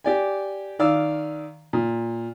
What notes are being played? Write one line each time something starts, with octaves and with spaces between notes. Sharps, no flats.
G4 D5 G#5
D#3 D5 F5 E6
A#2